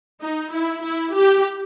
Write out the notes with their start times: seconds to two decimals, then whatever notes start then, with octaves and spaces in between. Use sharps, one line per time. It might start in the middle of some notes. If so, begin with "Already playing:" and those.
0.22 D#4
0.52 E4
0.83 E4
1.14 G4